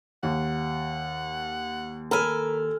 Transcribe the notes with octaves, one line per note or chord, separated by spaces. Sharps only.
D#2 F#5
A4 A#4 G#5 B5 F6